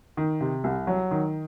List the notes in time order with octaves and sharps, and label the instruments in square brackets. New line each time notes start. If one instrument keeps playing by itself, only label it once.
[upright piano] D#3
C3
C2
F#3
D#3